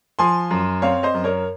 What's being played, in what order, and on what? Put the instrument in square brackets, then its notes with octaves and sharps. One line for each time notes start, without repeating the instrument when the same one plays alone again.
[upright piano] F3 G#5 C6
F#2
C4 C#5 F5
C5 D#5
F#2
A#4 C#5